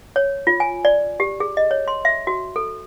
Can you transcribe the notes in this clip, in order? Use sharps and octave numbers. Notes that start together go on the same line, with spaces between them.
C#5
F4
G#5
D5
G4
G#4
D#5
C#5
C6
E5
F#4
A4